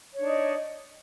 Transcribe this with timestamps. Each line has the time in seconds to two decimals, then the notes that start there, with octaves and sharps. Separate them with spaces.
0.12 C#5
0.17 D4
0.22 D#4
0.27 D#5